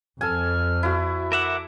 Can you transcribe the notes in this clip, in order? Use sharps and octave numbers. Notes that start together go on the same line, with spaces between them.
F2 A4 G#5 F6
E4 F#4
A#4 E5 F#5 D6